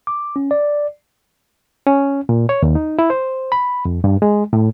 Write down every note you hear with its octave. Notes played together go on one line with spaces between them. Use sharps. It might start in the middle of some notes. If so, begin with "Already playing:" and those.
D6
C#4
D5
C#4
A#2
C#5
D#2
D#4
E4
C5
B5
F2
G2
G#3
A2